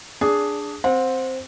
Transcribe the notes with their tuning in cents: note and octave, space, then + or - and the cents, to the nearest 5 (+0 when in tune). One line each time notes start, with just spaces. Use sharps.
D4 +0 G#4 +0 D5 -25
C4 +0 F#5 -35